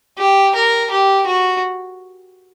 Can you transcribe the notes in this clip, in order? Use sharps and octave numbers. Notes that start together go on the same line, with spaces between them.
G4
A#4
G4
F#4